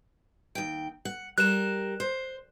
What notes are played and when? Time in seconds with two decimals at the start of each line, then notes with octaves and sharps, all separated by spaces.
0.55 D#2 G5
1.05 F#5
1.38 G3 A#4 F#6 E7
2.00 C5